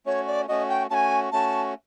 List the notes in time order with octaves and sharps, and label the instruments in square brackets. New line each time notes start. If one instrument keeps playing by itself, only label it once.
[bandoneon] A3 C#4 F#4 [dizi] C#5
[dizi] D5
[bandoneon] A3 C#4 F#4 [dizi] D#5
[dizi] G5
[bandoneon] A3 C#4 F#4 [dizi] G#5 A5
[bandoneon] A3 C#4 F#4 [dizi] A5